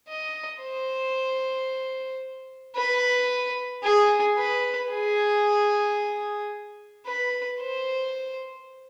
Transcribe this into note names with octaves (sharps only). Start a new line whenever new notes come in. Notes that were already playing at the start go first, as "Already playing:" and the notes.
D#5
C5
B4
G#4
B4
G#4
B4
C5